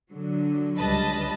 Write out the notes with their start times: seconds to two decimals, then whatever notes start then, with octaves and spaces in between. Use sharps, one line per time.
0.10 D3 F#3
0.77 C#2 G3 B4 D#5 A5